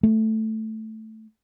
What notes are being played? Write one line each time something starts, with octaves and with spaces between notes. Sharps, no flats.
A3